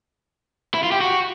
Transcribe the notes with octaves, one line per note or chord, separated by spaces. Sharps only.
E4
F4
G4
F#4